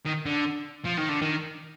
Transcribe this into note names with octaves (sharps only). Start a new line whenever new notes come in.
D#3
D3
F3
D#3
D3
D#3